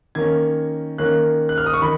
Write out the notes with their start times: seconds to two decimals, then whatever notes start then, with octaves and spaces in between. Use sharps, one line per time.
0.15 D#3 A#3 C#4 G#6
0.98 D#3 A#3 C#4 F#6
1.49 F#6
1.58 F6
1.66 D#6
1.74 C#6
1.82 D#3 B5